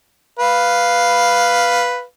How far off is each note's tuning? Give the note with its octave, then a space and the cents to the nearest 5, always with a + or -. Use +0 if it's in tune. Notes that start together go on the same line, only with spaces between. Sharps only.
B4 +0 F5 +0